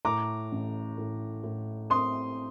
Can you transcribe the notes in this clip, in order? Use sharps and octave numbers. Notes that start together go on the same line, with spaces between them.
A2 A#5 D6
A1
A2
A2
C4 C6 D#6